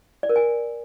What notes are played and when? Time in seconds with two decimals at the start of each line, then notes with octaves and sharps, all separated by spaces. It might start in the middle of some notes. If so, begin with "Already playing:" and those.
0.23 D5
0.29 A#4
0.36 G#5